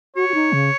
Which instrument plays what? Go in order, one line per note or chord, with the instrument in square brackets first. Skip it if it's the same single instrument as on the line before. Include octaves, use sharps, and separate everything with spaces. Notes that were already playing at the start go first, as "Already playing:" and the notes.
[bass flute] F#4 [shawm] C#5
[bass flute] F#4
D#4
C#3